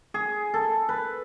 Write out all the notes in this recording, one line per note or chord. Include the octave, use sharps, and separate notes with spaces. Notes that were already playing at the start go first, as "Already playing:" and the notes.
G#4
A4
B4